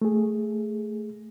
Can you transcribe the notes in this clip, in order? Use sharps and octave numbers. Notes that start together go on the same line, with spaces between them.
A3 G#4